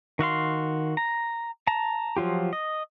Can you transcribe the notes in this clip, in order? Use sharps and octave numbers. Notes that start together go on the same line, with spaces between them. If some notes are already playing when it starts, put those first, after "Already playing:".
D#3 F#4 F5 C6
A#5
A5 A#5
F3 F#3 F4 G4
D#5